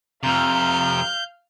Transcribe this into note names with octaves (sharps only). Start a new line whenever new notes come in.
F2 C3 F5 A#5 F6 G6